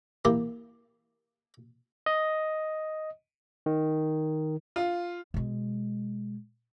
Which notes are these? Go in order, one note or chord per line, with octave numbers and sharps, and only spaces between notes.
A#3 E4 G4 G#5
D#5
D#3
F4
B2 G#3